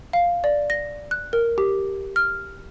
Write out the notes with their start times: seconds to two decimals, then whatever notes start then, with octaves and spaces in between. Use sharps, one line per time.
0.13 F5
0.44 D5
0.70 A#6
1.11 F#6
1.33 A#4
1.58 G4
2.16 F6